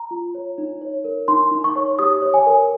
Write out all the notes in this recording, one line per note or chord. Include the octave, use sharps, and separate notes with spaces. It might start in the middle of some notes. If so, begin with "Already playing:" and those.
Already playing: A#5
F4
C#5
D#4
C#5
A#4
D#4 C6
D#4
C#6
C#5
G4 D#6
C#5
G#5
A#4